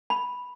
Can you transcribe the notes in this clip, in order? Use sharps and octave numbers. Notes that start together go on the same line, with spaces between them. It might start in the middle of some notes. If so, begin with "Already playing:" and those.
B5